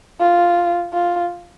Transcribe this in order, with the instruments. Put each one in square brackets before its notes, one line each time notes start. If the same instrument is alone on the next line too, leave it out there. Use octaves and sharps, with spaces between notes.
[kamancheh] F4
F4